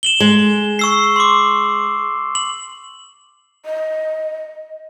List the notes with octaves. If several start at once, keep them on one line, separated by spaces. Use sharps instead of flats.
E7 F#7 G7
G#3
C#6 E6 C7
C6 D6
F#7
D#5